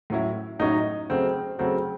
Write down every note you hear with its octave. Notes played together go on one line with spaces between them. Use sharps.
A2 F#3 C#4 E4
A2 F#3 C#4 D#4 E4
C#3 F#3 A3 C4
C#3 F#3 A3 C4